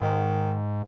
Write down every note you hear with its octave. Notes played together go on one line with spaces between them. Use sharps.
G#2 D#3